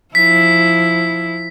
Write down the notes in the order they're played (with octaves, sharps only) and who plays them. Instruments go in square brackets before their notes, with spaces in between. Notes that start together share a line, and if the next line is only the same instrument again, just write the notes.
[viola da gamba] F3 E4 [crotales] B6